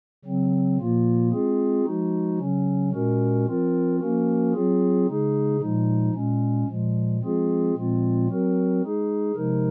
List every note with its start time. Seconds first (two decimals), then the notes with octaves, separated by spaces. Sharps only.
0.25 C#3 F#3 C4
0.78 A#2 F3 A#3 F4
1.31 G#3 C4 F4 G#4
1.86 F3 G#3 D#4 F#4
2.38 C#3 F#3 C#4
2.92 A#2 G#3 C#4 F#4 A#4
3.46 F3 C4 F4 A#4
4.00 F3 A#3 C#4 F#4 A#4
4.53 F#3 C4 F4 G#4
5.07 C#3 G#3 D#4 G#4
5.61 A#2 F3 G#3 D#4
6.14 A#2 G#3 C#4
6.67 A#2 F3 G#3
7.21 F3 G#3 C4 F4 G#4
7.75 A#2 F3 G#3 C4 F4
8.28 F#3 C4 F#4 A#4
8.82 G#3 D#4 G#4
9.35 C3 F3 G#3 D#4 A#4